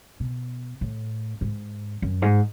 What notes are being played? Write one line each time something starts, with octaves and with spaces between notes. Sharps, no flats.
B2
A2
G#2
F#2
G#2